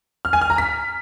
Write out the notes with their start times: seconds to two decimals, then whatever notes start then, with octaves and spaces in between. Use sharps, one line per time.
0.25 F6
0.33 G#5
0.41 F6
0.50 A#5
0.58 B6